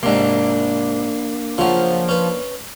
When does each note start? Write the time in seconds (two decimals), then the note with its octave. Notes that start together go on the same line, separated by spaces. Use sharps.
0.03 G#2 C3 A#3 D4
1.58 C#3 F3 F#3
2.09 C#4 B4